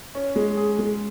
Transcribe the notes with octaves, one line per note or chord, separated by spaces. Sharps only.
C#4
G#3
G#4
G#3